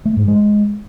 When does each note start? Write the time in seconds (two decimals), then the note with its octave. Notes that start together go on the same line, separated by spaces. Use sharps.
0.05 A3
0.17 G#2
0.28 G#3